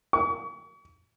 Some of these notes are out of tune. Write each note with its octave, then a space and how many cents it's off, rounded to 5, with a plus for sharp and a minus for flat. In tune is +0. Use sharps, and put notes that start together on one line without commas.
C#6 +40